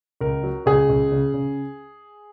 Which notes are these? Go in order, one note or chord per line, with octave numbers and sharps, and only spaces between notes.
C#2 A#4
F#3
C#2 G#4
C#2
C#3
C#3